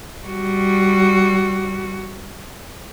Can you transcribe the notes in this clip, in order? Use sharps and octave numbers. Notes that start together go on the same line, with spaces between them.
G3 F#4